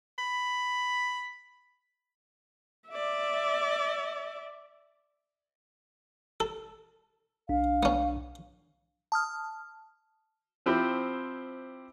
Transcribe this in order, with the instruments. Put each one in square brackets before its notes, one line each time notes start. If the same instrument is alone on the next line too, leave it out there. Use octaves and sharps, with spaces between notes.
[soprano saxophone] B5
[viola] D5 E5
[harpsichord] A4
[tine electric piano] B1 D4 [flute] F5
[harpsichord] B3 C#4
[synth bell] A5 D#6 F6
[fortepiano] F3 C4 E4 G4 C5